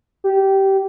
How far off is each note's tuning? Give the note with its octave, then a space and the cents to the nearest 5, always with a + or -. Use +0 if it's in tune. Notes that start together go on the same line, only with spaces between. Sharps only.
G4 -15